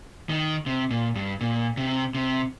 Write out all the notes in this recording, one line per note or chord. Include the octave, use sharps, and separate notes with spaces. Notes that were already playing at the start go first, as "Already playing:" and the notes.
D#3
C3
A#2
G2
A#2
C3
C3